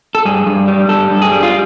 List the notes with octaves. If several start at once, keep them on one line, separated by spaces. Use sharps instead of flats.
A4
G2 G#4
G2
G3
G2 A4
G2
G#4
G3
F4